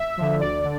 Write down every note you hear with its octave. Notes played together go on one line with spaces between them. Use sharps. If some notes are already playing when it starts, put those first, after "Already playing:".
Already playing: E5
D3 F3
D2 D5
D3